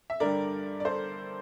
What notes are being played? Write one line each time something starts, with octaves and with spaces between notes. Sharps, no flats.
E5
G2 D3 G3 A#4 D5
D5
A4 C5